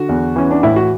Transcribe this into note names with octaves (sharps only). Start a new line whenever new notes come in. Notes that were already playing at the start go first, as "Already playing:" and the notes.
Already playing: D3 F#4
E2
E3 C#4
D4
A2 E4
F#4